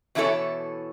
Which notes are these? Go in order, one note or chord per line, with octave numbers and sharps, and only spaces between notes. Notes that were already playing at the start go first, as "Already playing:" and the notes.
B2 E3 D4 E4 A4 C#5